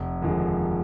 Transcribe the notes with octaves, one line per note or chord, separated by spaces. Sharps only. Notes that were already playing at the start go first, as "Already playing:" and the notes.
Already playing: F1
D#2 D3 F3 G#3